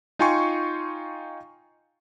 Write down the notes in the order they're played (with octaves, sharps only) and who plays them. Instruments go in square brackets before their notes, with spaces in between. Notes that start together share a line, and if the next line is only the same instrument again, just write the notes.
[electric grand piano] D#4 F4 G5 G#5 C6 C#6